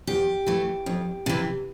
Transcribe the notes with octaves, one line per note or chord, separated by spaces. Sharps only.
E2 G4
E3 A3
F2
C3 E3